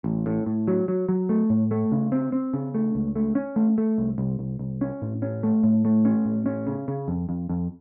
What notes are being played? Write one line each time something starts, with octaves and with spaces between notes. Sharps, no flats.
A1
A2
A2
F#3
F#3
F#3
A3
A2
A3
C#3
C4
C4
C#3
A3
C#2
A3
C#4
A3
A3
C2
C2
C2
C2
C#4
A2
C#4
A3
A2
A3
C#4
A2
C#4
C#3
C#3
F2
F2
F2